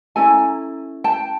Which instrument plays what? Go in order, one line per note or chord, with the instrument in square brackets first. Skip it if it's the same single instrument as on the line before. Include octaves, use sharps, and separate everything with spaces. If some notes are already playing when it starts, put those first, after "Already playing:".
[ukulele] C#4 E4 A4 G#5 A#5
G5 A5